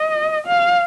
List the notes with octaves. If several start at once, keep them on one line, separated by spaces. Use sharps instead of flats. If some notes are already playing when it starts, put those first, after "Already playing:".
Already playing: D#5
F5